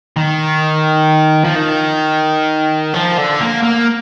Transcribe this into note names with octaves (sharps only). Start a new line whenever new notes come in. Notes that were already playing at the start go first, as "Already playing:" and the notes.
D#3
F3
D#3
F3
D3
A#3
A#3